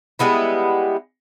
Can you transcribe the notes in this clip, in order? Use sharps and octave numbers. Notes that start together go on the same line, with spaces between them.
G3 G#3 B3 E4